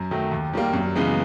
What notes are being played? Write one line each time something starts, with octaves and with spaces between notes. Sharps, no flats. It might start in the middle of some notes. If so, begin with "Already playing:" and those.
Already playing: F#2
D#3 F#3 A3
D#2
D#3 G3 A#3
F#2
C#3 E3 G#3 B3